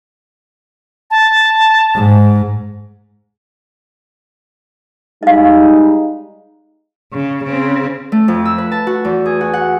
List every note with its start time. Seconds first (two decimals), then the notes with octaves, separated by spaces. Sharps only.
1.11 A5
1.95 G#2
5.23 G3 G#3 D#4 D#5 F5
7.13 C#3
7.44 C#3 C4
8.12 A3
8.28 F2
8.45 E6
8.58 B4
8.71 A5
8.87 F#4
9.05 E2
9.26 G#4
9.41 F#4
9.53 F#5